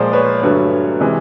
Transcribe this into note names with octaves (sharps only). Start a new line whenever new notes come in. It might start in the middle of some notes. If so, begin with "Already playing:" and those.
Already playing: A#2 F3 G#3 C5 D5
B4 C#5
G2 D3 F#3 A3 B4 C#5
C3 E3 G#3